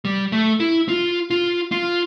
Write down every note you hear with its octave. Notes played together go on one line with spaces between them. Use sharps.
G3
A3
E4
F4
F4
F4